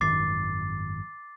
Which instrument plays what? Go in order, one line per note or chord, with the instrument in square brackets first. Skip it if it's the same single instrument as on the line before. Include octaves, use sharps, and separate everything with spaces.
[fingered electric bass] G#1 F#2 D#3 [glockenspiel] D6 A6 C7